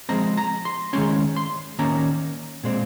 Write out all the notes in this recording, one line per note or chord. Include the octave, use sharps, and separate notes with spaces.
F3 G#3 C4 A#5
A#5
C6
D#3 G#3 C#4 C6
C6
D#3 A#3 C#4 A#5
A#2 G#3 C4